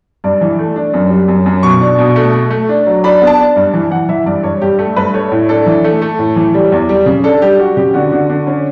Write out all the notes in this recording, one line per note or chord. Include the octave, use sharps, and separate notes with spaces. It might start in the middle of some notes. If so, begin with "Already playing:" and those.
G2 D5
E3
A3
D4
F#2
G3
F#2
F#2
B2 C#6
D4
B2
A3
A3
A3
D4
F#3
D4 B5
B3
A5
D4
G2
E3
E3 F#5
E3 E5
G2 D5
G2 C#5
G2 G4
A3 A4
G2 B4
A3 C#5
A2
D4 A4
E3
A3
A3
A2
E3
G3
E2
G3
C#3
D4 A4
G3 G4
G3 F#4
C#3 G4
D3 F#4
D3
D3
C#4